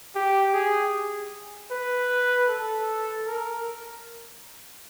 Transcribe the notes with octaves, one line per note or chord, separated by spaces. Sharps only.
G4
G#4
B4
A4
A#4